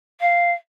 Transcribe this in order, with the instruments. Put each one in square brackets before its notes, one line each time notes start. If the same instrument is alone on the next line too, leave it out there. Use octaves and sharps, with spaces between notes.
[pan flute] F5